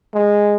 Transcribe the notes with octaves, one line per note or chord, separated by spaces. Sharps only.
G#3